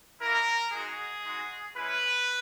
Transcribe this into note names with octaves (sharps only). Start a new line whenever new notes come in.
A#3 E4 A#4
G#3 D#4 F#4 G#4
G#3 D#4 F#4
G#3 C#4 E4 B4